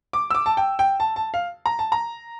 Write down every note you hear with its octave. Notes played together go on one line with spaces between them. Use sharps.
D6
E6
D6
A5
G5
G5
A5
A5
F5
A#5
A5
A#5